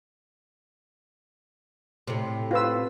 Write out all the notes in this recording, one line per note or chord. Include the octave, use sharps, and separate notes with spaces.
A2 C3
F4 B4 E6